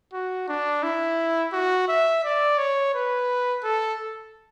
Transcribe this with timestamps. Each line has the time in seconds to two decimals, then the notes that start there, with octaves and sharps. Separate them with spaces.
0.13 F#4
0.49 D4
0.83 E4
1.53 F#4
1.88 E5
2.24 D5
2.58 C#5
2.94 B4
3.64 A4